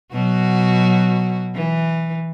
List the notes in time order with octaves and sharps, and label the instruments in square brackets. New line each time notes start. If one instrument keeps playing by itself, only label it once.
[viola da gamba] B2 F#3 F#4
E3